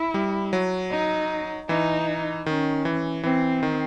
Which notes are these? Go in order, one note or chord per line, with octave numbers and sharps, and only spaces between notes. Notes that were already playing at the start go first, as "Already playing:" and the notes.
Already playing: E4
G3
F#3
D#4
E3 D#4
D#3 C#4
E3
E3 C4
D#3